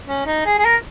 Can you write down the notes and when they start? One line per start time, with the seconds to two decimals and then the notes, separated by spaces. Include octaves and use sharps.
0.07 C#4
0.26 D#4
0.46 G#4
0.59 G#4
0.65 A#4